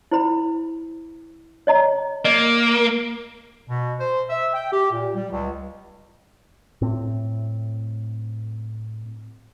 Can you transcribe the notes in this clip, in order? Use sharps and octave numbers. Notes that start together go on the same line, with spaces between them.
E4 C5 B5
C#5 D#5 A#5
A#3 D#5
B2
C5
E5
G5
G4
A#2
G3
C#2
A2 C4